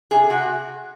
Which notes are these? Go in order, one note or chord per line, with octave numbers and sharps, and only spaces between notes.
C3 G#4
C3 F#4